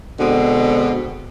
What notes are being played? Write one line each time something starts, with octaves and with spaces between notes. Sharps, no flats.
B2 D3 G#3 C4